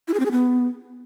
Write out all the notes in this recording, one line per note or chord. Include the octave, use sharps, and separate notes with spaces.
E4
G#4
C4
G#4
B3